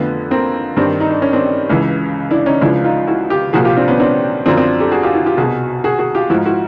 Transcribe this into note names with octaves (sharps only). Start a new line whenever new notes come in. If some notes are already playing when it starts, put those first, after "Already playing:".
Already playing: F2 D3 F3 A3 B3
A#3 C4
G2 D#3 C4 D4
D#4
D4
C#4
C4 D4
C#2 C#3 E3
D4 E4
C#4 D#4
C#2 C#3 F3 D4 E4
D#4 F4
E4 F#4
F4 G4
C2 A#2 F3 F#4 G#4
F4 G4
C4 D4
B3 C#4
C4 D4
F#2 D3 F3 C4 D4
C4 D4
G4 A4
F#4 G#4
F4 G4
E4 F#4
F4 G4
C2 B2 F#4 G#4
F#4 G#4
F#4 G#4
F4 G4
G#2 F3 E4 F#4
E4 F#4